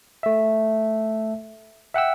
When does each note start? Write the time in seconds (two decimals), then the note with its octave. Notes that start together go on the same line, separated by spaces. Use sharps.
0.23 A3 E5
1.94 E5 F#5 G5 E6